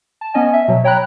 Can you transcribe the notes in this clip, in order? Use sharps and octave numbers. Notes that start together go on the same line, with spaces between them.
A5
B3 C#4 D#5 G#5
E5
B2 F#3
F#3 C#5 G5 A#5 B5 F#6